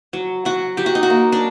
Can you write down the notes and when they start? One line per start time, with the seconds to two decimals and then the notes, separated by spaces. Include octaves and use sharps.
0.13 F#3
0.45 F#3 F#4
0.77 F#3 G4
0.86 F#4
0.95 D#4
1.03 F#4
1.10 A#3
1.32 D4